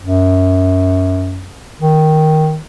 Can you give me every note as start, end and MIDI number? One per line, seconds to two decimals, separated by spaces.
0.01 1.53 42
1.81 2.58 51